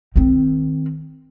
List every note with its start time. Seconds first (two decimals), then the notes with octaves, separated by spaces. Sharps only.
0.16 D#3 C4